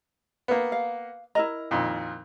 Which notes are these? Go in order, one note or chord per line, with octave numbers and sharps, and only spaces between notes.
A#3 B3
F5
E4 A#4 D#5 A#5
F2 A#2 D#3